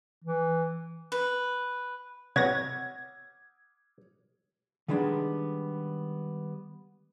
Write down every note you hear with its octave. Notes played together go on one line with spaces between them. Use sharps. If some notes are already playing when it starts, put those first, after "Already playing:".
E3
B4
C3 B4 C#5 F#5 G#6 A#6
D#3 G3 G#3 B3 D4